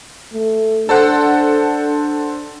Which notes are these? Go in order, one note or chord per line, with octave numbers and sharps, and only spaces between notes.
A3
D4 A4 C5 F#5